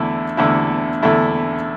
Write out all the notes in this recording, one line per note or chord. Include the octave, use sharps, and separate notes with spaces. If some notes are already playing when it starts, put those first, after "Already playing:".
Already playing: E2 D3 A3 E4
E2 D3 A3 E4
E2 D3 A3 E4